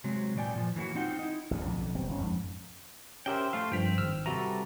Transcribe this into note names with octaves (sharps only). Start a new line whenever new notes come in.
C3 F#3 G#3 C4
A#2 E3 D5 G5 G#5
A#2 E3 F3
E3 F#3 A#3 E4 F#4
C4 D#4 F4 F#5 G5
D#4 E4
A1 E2 A2 D3
B1 F2 A2 D3
G#1 B2 G3 C4
G1 C#4
F2 G#2
C#4 G4 A#4 C5 E5 G5
A3 F4 F5 C6
G2 F3 C4 F5 G5 B6
G#1 E6 F6
C3 E3 G3 F#4 A4 A#5